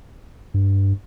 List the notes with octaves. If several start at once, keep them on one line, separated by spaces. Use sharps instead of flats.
G2